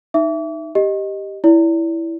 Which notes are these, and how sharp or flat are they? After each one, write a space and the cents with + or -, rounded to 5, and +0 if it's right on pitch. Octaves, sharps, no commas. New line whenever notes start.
D#4 +0 E5 +10 D6 -40
G4 +0 D#5 +0
E4 +0 D5 -35